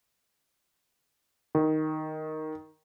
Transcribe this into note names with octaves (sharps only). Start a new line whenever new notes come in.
D#3